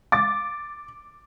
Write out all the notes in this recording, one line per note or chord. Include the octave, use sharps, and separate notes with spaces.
D6 A6